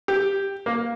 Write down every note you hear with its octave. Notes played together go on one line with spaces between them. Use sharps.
G4
A#3